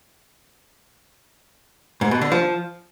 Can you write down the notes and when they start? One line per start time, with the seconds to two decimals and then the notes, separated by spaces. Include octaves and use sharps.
2.01 G#2
2.11 B2
2.21 D3
2.32 F3